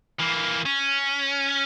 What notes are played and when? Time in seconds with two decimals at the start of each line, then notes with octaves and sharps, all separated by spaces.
0.19 E3 A#3
0.65 C#4